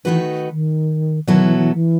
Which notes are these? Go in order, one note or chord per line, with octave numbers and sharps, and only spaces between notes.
D#3 E3 A3 D#4 F#4 B4
D#3
B2 D#3 F#3 B3 E4 A4
E3
E3
E3